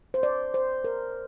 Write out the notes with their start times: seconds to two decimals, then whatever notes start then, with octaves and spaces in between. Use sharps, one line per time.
0.14 C5
0.23 D5
0.54 C5
0.84 A#4